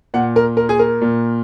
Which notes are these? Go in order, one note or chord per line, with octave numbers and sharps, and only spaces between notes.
A#2 F#5
A#4
A#4
G#4
A#4
A#2